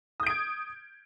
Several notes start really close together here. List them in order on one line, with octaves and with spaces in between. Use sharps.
D#6 G6 D7 G#6